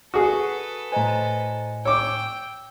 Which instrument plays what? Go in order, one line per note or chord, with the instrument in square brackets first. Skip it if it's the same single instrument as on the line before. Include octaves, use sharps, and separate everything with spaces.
[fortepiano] F#4 G#4 [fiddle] A4 B4
[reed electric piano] A2 G#5 [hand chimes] C5 D#5 A#5
[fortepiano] C#5 D6 [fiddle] G5 [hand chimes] E6